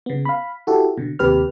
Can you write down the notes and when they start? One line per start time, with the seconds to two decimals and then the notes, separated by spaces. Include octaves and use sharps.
0.06 C#3 B3
0.25 F5 B5
0.67 E4 F#4 G4 A4
0.98 B2 D3
1.19 D#2 C3 G4 B4 F6